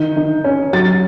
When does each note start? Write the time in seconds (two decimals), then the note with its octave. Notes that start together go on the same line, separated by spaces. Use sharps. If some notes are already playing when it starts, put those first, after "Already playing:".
Already playing: D#3 G6
0.16 D#3
0.44 C#4
0.73 F#3 A6